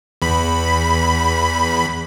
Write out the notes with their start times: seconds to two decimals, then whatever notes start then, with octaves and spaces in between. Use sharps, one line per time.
0.22 E2 B5